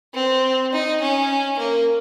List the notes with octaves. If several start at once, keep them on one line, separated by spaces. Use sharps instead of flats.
C4
D#4
C#4
A#3